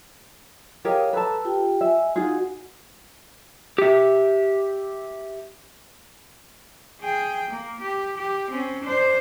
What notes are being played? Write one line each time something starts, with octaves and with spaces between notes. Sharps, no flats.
G4 G#4 A#4 C#5 D#5 F5
A4 B4 A5 A#5 E6
F4 G4 G5
D#5 E5 G#5
D#4 F4 F#4 G#4 F#5
G4 E5
G#4 G5
A#3
G4
G4
C4 C#4
D4 C5